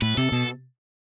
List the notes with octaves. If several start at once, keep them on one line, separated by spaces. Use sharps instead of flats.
A2 B4
C3 A4
B2